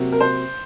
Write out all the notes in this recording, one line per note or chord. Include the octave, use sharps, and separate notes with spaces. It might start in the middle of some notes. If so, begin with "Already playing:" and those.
Already playing: C3 F#3 A#3
A#4
C5